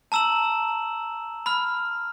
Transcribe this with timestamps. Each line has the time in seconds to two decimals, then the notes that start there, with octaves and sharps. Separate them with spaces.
0.12 A5 A#5 E6 E7 F#7
1.46 B5 F6